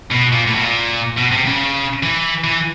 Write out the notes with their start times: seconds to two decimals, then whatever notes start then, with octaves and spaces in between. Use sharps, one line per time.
0.11 B2
0.33 A#2
0.47 A2
0.55 B2
0.61 A#2
1.17 B2
1.31 C3
1.46 C#3
2.03 E3
2.44 E3